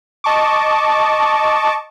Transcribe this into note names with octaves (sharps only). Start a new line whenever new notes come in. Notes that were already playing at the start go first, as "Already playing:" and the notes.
D#5 A5 C#6 D6